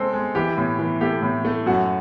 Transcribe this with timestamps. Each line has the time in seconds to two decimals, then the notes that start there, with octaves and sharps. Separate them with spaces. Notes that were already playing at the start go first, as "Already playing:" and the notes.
Already playing: G#3 C4 A4
0.13 G#3
0.35 E3 G4
0.57 A2
0.79 E3
1.01 A3 G4
1.22 A2
1.45 A3
1.66 F#2 F#4